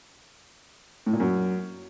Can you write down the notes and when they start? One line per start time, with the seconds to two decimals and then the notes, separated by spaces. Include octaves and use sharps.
1.06 A2
1.13 A#2
1.20 F#2